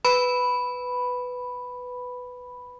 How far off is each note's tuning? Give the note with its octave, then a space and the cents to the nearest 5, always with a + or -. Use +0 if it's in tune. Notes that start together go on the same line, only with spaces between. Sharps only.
B4 +10 B5 +0